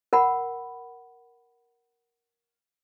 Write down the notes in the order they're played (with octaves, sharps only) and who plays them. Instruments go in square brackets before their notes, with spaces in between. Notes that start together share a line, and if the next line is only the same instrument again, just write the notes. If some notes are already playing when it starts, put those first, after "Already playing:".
[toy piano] A#4 F#5 B5